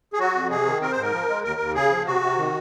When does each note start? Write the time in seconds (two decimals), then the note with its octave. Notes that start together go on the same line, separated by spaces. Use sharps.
0.13 G#4
0.19 F#3 F#4
0.35 F2
0.50 C3 G#4
0.66 D#3
0.82 C4 A#4
0.92 G#2 C5
1.02 A#4
1.12 F3
1.29 G#3
1.44 D#2 A#4
1.60 D#2
1.75 C#3 G#4
1.91 F3
2.06 C3 F#4
2.22 C3
2.38 D#3